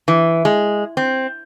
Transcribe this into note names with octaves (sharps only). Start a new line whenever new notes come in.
E3
G#3
C4